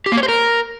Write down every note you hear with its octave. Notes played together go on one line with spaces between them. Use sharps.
G4
A#3
C#5
C5
A#4